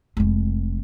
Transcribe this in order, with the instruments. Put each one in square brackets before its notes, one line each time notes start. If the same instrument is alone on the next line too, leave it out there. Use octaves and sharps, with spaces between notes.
[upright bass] F1 G#3